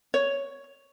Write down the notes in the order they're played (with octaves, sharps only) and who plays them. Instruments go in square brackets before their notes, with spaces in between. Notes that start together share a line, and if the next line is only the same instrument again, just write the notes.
[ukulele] C#5